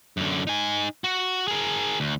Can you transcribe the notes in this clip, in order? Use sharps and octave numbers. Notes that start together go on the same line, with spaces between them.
F#2 D3
D#4 G#5
F#4
G#4 A#4
D2